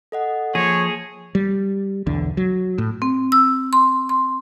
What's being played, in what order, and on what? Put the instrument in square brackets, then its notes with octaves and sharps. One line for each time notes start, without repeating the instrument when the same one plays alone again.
[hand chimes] A4 D#5 F#5
[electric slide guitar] F3 [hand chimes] A#3 G#6 A#6 [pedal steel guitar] G#4 [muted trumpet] C#5
[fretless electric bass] G3
B1 E2 D3
F#3
A2
[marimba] C4
E6
C6
C6